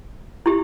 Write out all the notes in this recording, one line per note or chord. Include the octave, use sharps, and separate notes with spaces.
E4 G4